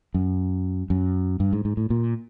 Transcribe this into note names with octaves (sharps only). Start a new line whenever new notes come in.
F#2
F#2
G2
G#2
G#2
A2
A#2